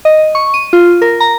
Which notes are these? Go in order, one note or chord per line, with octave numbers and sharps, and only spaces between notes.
D#5
C#6
D#7
F4
A#4
A#5